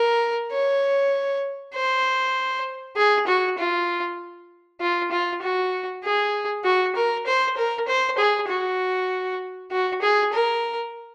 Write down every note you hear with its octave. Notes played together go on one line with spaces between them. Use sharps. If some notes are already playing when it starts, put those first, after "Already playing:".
Already playing: A#4
C#5
C5
G#4
F#4
F4
F4
F4
F#4
G#4
F#4
A#4
C5
A#4
C5
G#4
F#4
F#4
G#4
A#4